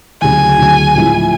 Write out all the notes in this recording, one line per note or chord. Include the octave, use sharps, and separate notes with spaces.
D2 C#3 F#3 G#5
D2 C#3 F#3
A2 F3 G#3 C4 E4